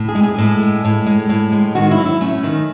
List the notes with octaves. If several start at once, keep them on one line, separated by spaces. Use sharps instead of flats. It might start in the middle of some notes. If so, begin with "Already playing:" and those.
Already playing: A2
G#4
G#3
G#4
A2 A4
G#3
A2
G#3
A2
G#3
D#3 F#4
E4
F#3
E4
A3 C#4
D#3